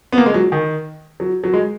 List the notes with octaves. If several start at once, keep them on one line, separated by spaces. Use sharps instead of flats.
B3
A#3
G#3
F#3
D#3
F#3
F#3
G#3